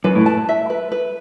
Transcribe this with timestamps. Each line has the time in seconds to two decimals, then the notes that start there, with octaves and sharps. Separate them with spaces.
0.04 F#2 B4
0.15 A2
0.26 A5
0.49 E5
0.70 B4
0.92 B4